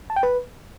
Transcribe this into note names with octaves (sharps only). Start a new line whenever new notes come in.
A5
G5
B4